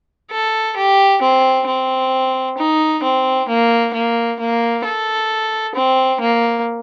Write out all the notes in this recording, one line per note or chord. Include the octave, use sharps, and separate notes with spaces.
A4
G4
C4
C4
D#4
C4
A#3
A#3
A#3
A4
C4
A#3